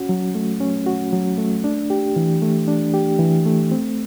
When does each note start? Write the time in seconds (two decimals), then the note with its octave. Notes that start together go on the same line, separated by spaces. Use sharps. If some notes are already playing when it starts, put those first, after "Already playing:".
Already playing: C#4 F#4
0.09 F#3
0.35 A3
0.61 C#4
0.86 F#4
1.13 F#3
1.38 A3
1.64 D4
1.90 G4
2.16 E3
2.42 A3
2.68 D4
2.94 G4
3.19 E3
3.46 A3
3.71 C4